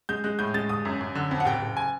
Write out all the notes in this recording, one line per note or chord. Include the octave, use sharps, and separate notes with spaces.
G#3 G6
G#3 F#6
A2 G6
G#3 A6
G1 D#6
F#2
F#2
D3
F2
F#5
F#1 G5
F#1
G#5